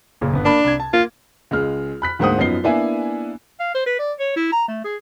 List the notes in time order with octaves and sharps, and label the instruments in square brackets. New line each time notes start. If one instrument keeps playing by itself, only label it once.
[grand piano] F#1 A#2 C#3
G1 B3
[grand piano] A#3 A5 B5 [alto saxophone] D4
[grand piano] C2 G#6
A5
[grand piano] A#3 [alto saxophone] F4
[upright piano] C#2 G#3 F6
B5 F#6 B6
D2 G#2 A#3 C5 F#5 D#6
F#2 F3 B3 D#4 C7 G7
A#3 B3 D4 E4 E5 G#5
[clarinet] F5
C5
B4
D5
C#5
E4
A#5
A3
G#4